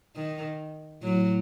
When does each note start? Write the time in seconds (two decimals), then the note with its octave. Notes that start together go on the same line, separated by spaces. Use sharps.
0.16 D#3
1.03 A2 F#3